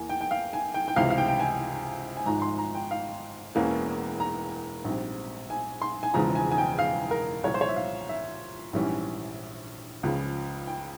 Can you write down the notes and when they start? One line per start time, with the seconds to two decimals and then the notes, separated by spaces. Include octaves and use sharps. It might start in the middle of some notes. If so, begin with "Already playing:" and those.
Already playing: E2 E3 A#3 G#5
0.10 G5
0.21 G5
0.31 F5
0.53 G#5
0.74 G5
0.88 G5
0.96 C#2 C3 E3 F5
1.10 F5
1.18 G5
1.28 G5
1.39 G#5
2.17 G#5
2.25 G#1 G#2 F3 G#3 A#5
2.42 C6
2.58 A#5
2.75 G5
2.91 F5
3.55 E1 E2 E3 A#3 C#4
4.20 A#5
4.84 A#1 G#2 G3 C4
5.50 G#5
5.82 C6
6.03 G#5
6.14 E1 E2 C#3 F3 G#3 A#5
6.35 G#5
6.52 G#5
6.58 G5
6.79 F5
7.11 A#4
7.43 C2 A#2 F3 C#5
7.54 C5
7.61 C#5
7.69 E5
7.76 F5
8.09 E5
8.73 A#1 G#2 E3 G3 C#4
10.03 C#2 C#3 F3
10.67 G5